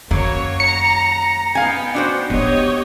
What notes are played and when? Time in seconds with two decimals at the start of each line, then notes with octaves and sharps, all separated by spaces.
0.11 F#2 D#3 F#3 A#3 C#5
0.60 A#5 C#7
1.55 B3 D#4 F5 G5 G#5
1.95 D4 F#4 C5
2.30 B3 D#4 G4 C#5 D#5